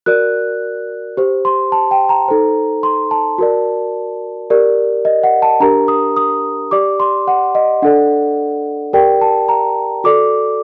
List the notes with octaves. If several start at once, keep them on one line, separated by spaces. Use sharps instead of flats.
F#4 A#4 D5 F#6
G4 C5
C6
A5
G5
A#5
D#4 A4 C5
C6
A5
F#4 A#4 D5
G4 A#4 D5
D#5
F#5
A5
D4 G4 A#4 A#5
D#6
D#6
G4 D5 D6
C6
F#5
D#5
D4 A4 D5 F#5
G4 A#4 D5 G5
A5
A#5
F#4 A4 D5 D6